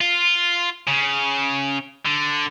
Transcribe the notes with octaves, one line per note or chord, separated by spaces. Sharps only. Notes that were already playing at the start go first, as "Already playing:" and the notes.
F4
C#3
D3